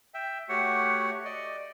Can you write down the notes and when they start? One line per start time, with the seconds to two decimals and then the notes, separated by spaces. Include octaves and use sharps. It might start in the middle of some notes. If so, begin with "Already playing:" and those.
0.14 E5 G5
0.49 A3 F#4 G4 C#5 F#5
1.25 D5 D#5